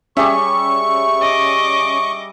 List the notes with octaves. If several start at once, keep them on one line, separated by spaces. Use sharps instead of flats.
G3 C#4 G#4 E5 C#6
D#5 D6